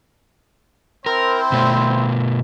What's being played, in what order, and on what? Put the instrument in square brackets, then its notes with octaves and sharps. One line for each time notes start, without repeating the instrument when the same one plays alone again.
[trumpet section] C4 E4 C5 [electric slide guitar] A#4
[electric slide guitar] B2 A3